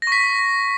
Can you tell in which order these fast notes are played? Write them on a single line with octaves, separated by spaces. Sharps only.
A#6 C#6 B6